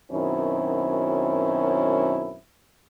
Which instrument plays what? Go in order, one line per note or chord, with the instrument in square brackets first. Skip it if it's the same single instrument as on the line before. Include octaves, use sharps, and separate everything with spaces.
[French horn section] F#2 B2 D#3 C4 C#4 E4